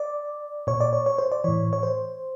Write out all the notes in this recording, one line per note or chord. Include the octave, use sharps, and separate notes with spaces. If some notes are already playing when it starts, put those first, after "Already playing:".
Already playing: D5
A#2 C#5
D5
C#5
C#5
C5
D5
A2 E3 C#5
C#5
C5